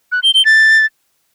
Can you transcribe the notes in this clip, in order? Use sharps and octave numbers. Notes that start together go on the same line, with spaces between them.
F#6
G7
G7
A6